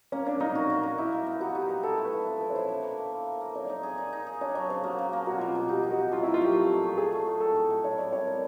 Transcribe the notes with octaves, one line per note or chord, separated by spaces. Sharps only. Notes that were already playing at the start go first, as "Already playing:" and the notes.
A#3 C#4
A#3 D4
A#3 D#4
F#4
A#3
A#3
D#4 E4
G3
B3
D#4 F#4
D#4 G4
B3
E4 A4
A3
B4
E4
F3 B4
E4 B4
C#5
E4 C5
D3
A#3
A#3
A#3
A#3
A#3
D#4 C#5
D5
D#4 C#5
G#4
D#4
D#4
G#4
D4 C#5
F#3 C#5
C#3 C5
A#3 F#4
C#3
A#3
B2 F#4
F4
G3
F4
B2 F#4
D#4 G4
D#4
F#4
D#4
F#3 F4
A#2 E4
F4
F#3 G4
A3 G4
A3
A3
A3 G#4
F#3
A2
A2 A4
A2
A2
E4 C#5
G3 D5
G3 C#5
B3 A#4